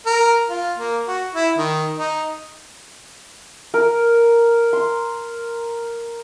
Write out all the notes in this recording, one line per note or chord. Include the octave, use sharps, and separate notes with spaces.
A#4
F4
A#3
F#4
E4
D#3
D#4
A#4
C6